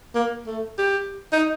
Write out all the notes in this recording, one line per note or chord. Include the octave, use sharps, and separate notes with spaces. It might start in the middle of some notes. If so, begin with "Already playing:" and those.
A#3
A3
G4
D#4